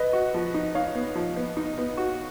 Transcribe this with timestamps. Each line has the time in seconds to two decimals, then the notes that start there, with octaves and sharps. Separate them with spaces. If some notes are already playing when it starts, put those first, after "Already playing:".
Already playing: B4 D#5
0.13 F#4
0.34 F3
0.54 D#4
0.75 D#4 C#5 F5
0.95 B3
1.15 F3
1.36 B3
1.57 D#4
1.78 B3
1.97 F#4